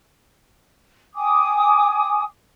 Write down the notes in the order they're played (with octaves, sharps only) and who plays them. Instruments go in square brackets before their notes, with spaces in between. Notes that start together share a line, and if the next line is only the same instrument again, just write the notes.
[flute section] G5 G#5 D6 D#6